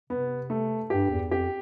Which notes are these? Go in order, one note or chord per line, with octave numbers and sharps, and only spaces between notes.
C3 B3
A3
G2 G4
E2
F2 G4